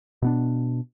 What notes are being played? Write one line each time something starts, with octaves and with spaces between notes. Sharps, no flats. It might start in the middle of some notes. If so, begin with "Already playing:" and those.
B2 B3 D4